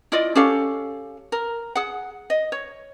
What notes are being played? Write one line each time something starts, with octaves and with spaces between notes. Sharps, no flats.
E4 F4 D5 D#5
C#4 G4 A4 F5
A#4
G#4 F#5
D#5
C#5